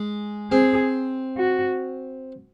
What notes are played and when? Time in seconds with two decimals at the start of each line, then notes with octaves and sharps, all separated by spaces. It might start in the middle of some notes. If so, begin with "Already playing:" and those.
Already playing: G#3
0.51 C4 G#4
1.38 F#4